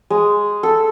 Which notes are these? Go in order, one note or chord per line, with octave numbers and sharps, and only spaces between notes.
G#3
A4